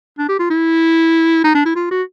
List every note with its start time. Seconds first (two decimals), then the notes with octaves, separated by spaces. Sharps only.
0.19 D4
0.29 G4
0.39 F4
0.50 E4
1.44 D#4
1.55 D4
1.65 E4
1.76 F4
1.91 F#4